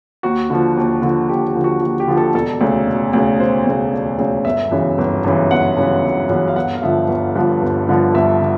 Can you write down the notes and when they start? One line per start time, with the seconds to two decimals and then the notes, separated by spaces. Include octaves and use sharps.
0.23 D#2 F#4
0.50 D3 F3
0.77 D#2
1.02 D3 F3
1.29 D#2 G4
1.47 G4
1.55 D3 F3
1.64 F#4
1.81 D#2 F#4
2.00 G4
2.08 D3 F3
2.17 A4
2.34 E1 A4
2.61 D2 C#3
2.87 E1
3.13 D2 C#3
3.40 E1 C5
3.67 D2 C#3
3.93 E1
4.19 D2 C#3
4.45 G1 E5
4.71 F#2 C#3 E3
4.98 G1
5.24 F#2 C#3 E3
5.51 G1 F#5
5.77 F#2 C#3 E3
6.04 G1
6.29 F#2 C#3 E3
6.48 F5
6.56 G1 F#5
6.75 F5
6.82 G2 D3 F3 E5
7.08 G1
7.35 G2 D3 F3
7.62 G1
7.88 G2 D3 F3
8.14 G1 E5
8.41 D3